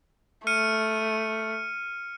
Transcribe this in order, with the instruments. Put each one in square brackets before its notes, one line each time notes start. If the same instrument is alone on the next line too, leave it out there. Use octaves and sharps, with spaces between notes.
[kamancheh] A3 [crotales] F6 C#7 D#7